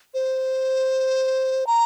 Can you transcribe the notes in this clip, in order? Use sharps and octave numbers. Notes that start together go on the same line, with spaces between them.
C5
A#5